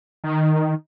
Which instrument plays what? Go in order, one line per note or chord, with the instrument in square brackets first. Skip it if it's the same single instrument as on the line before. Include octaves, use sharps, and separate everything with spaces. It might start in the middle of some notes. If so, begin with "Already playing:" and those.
[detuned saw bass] D#3